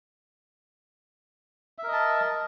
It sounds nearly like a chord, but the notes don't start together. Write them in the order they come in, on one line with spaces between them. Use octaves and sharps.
E5 A#4 D#5 A5